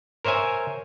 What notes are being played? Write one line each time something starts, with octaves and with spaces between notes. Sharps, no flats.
A#4 C5 C#5 E5 G#5